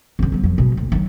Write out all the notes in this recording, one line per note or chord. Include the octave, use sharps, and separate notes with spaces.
F2 D3
F#3 B3
G1 F2
B2 G#3
D2
D#3 F#3